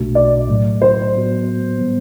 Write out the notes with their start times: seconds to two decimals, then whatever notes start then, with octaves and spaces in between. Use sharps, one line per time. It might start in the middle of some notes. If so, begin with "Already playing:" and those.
Already playing: B1 B2 A3 D4 F#4
0.15 D5
0.48 A2 F#3 A3
0.82 C5
1.14 A2 F#3 B3 F#4
1.78 E3 G3 B3